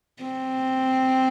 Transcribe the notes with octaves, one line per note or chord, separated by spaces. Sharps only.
C4